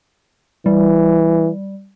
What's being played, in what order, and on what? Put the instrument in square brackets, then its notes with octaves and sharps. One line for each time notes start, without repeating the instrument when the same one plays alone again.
[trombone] E3 [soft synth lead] G3